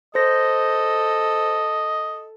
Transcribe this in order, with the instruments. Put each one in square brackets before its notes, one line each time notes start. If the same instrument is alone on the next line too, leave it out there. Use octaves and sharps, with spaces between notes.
[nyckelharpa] A4 [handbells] C5 A#6 [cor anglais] D#5